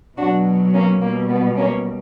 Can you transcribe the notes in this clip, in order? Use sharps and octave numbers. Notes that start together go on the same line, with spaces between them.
B2 F#3 D4 F#4
A#3 C#4
B2 G3 A#3
B3
A#3 C#4